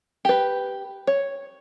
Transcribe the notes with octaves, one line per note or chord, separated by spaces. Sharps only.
G4 B4
C#5